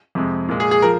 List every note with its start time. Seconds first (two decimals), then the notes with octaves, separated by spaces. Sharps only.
0.15 F2 C3 G#3
0.49 A#2 G#3
0.60 G#4
0.71 G#4
0.82 F3 A#4